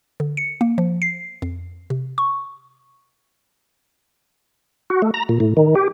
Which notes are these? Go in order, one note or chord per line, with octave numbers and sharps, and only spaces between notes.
D3
C#7
A#3
F3
C7
F2
C3
C#6
F#4
A3
A#5
A#2
A2
D#3
G4